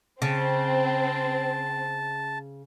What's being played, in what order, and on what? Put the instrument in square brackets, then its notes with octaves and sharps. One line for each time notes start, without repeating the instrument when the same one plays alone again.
[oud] C#3 [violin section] C4 [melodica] A5